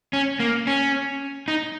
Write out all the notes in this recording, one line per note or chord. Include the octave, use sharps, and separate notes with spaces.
C#4
A#3
C#4
D#4